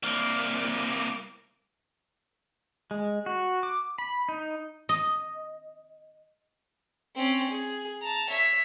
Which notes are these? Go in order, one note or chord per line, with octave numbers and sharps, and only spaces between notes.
C2 A#3
G#3
F#4
D6
B5
D#4
D#5
C4 C#4
G#4
A5 A#5
C#5 E5